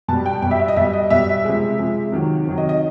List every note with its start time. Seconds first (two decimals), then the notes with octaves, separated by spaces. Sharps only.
0.08 B2 G3 A5
0.26 G5
0.42 B2 G5
0.47 G3 E5
0.60 E5
0.68 D#5
0.76 B2 G3 E5
0.93 D#5
1.10 B2 G3 E5
1.44 C3 F3 G#3
1.78 C3 F3 G#3
2.12 C3 D#3 F#3
2.46 C3 D#3 F#3
2.58 D#5
2.69 D#5